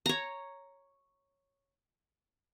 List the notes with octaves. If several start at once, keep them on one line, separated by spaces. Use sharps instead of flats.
C#5 A#5